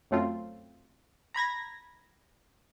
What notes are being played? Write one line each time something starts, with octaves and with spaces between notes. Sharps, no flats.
F#2 F#3 A3 C4 F4
A#5 B5 G#6 A#6